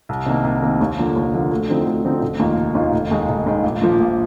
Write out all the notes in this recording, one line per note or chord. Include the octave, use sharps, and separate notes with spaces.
C2
C3 D#3 A#3
C2
C3 D#3 A#3
D#2
D3 F3 A#3
D#2
D3 F3 A#3
D2
D3 F3 C4 D#4
D2
D3 F3 C4 D#4
F1
D#2 D#3 A#3 F4
F1
D#2 D#3 A#3 F4
F1
D#2 D#3 G#3
F1
D#2 D#3 G#3
A#1
A#2 F3
A#1